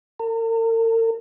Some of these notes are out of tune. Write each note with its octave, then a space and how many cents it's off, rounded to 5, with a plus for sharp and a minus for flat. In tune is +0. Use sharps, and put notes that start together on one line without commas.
A#4 -45